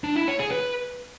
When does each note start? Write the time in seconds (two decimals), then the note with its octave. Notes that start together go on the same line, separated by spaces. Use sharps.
0.04 D4
0.16 E4
0.28 C#5
0.40 G#4
0.51 B4